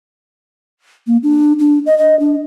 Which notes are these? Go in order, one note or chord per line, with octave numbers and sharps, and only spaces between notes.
A#3
D4
D4
D#5
D#5
D4